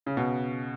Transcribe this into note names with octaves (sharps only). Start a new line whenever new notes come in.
C#3
B2